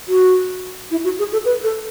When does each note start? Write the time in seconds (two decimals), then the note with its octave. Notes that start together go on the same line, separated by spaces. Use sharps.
0.08 F#4
0.91 E4
1.04 F#4
1.19 G#4
1.33 A4
1.45 B4
1.63 A4